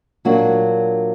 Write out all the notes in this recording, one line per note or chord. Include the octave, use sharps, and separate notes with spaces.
A#2 F#3 A#3 D4 F#4